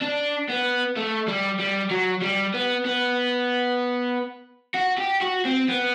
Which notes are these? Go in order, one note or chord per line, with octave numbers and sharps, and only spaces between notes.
D4
B3
A3
G3
G3
F#3
G3
B3
B3
F#4
G4
F#4
C4
B3